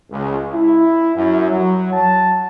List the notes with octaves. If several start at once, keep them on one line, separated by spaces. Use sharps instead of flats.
C#2
E4
F#2
F#3
A5